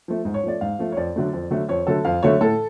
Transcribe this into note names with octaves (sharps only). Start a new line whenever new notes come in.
F3 A3
G#2
C#5
F3 A3 D5
G#2 F5
F3 A3
C#5
F2 D5
D3 F#3 A3
F2
D3 F#3 A3
F2 C#5
D3 F#3 A3 A4
F2 F5
D3 F#3 A3 C#5
A2 A4